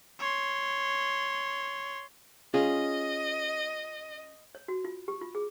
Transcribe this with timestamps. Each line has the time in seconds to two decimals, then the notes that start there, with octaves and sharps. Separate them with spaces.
0.19 C#5 C6
2.54 C#4 F4 G#4 D#5
4.55 C#5
4.68 F#4
4.84 F4
5.08 G4
5.21 F4
5.35 G#4